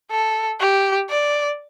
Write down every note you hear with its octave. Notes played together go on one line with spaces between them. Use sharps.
A4
G4
D5